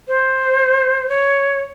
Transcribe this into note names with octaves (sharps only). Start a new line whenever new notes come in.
C5
C#5